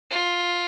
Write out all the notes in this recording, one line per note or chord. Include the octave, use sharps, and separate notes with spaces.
F4